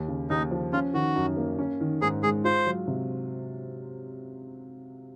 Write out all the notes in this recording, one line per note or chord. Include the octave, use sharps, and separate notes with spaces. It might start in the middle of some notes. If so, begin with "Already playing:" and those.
Already playing: D#2
C#3
D#2 D#4
F3
C#4 F4
D#3 F#4
F#2
A#3
C#4
D#3
G#2 G#4
G#3 G#4
F4 C5
F#3
C3